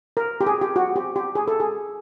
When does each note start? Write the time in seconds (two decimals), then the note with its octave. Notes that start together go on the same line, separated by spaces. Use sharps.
0.17 A#4
0.41 G4
0.46 G#4
0.61 G4
0.76 F#4
0.96 G4
1.16 G4
1.35 G#4
1.48 A4
1.60 G#4